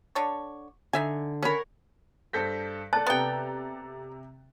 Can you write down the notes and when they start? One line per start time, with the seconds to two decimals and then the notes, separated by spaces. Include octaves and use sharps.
0.15 D3 D4 C#5
0.93 D3 D#4 E5 G#5
1.43 C#4 A#4 C#5 F#5 B5
2.33 G2 A4 C5 G6 A#6 B6
2.93 A4 D5 A5 F#6 A6
3.07 C3 B3 G5 A#5